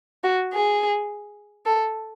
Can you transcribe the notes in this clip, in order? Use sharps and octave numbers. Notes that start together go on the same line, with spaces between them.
F#4
G#4
A4